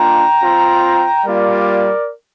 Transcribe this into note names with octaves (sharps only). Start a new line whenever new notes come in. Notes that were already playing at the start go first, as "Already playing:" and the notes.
Already playing: A#3 D4 F4 G5 A#5
C4 F4
G3 A#3 F4 A#4 D5